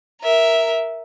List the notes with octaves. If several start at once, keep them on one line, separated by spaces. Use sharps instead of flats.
A#4 E5